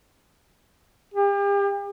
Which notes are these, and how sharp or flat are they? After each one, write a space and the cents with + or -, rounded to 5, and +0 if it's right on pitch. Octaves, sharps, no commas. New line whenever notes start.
G4 +40